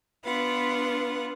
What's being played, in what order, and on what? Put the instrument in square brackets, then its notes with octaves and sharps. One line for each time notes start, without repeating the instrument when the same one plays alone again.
[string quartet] B3 D4 F4 B4 F#5